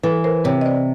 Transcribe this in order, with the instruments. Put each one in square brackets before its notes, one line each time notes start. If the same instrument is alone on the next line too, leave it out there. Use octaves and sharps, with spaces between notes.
[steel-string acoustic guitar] E3 [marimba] A4 B4
[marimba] A#4 C5
[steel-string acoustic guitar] C3 [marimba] B4 C#5
[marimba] D#5
C5 D5